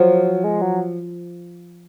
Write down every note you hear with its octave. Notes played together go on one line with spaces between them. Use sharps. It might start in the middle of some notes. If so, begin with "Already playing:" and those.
Already playing: F3 F#3
G#3
F#3